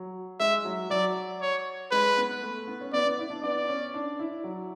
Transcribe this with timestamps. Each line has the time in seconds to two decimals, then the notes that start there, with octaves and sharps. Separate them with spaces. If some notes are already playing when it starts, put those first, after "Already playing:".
Already playing: F#3
0.40 G#3 E5
0.65 F#3
0.90 F#3 D5
1.41 C#5
1.91 G#3 B4
2.17 B3
2.42 A3
2.67 B3
2.81 C#4
2.93 B3 D5
3.06 B3
3.19 E4
3.30 D4
3.43 B3 D5
3.68 C#4
3.94 D4
4.19 E4
4.44 F#3